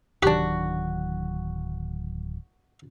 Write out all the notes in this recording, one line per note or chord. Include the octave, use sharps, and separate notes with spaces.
D1 D#3 F#3 D4 F#4 G4